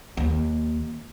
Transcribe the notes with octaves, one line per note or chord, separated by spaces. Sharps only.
D#2